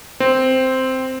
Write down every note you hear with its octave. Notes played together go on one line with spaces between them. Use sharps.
C4